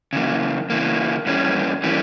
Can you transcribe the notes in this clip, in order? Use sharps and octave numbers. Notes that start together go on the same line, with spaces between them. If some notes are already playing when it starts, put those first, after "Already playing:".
C#3 E3 A#3
C#3 E3 A#3
G2 E3 G3 A#3 C#4
E3 G3 A#3 C#4